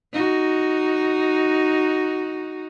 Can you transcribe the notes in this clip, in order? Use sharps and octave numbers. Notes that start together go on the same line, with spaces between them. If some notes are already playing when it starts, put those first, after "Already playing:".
D#4 F#4